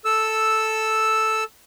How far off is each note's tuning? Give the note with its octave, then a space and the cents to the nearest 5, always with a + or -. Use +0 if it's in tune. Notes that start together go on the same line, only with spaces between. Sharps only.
A4 +0 E6 +0